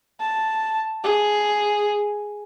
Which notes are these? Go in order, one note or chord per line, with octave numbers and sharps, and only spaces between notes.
A5
G#4